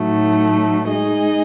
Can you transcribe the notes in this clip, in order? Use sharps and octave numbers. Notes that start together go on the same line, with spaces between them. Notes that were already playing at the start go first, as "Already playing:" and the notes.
Already playing: A2 F#3 A3 D#4 F#4
G#3 D#4 G#4 D#5